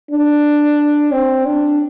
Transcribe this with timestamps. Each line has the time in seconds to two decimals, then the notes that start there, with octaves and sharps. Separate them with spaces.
0.11 D4
1.12 C4
1.46 D4